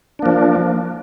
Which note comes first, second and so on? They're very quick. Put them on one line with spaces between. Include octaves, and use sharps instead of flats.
D4 A#3 F3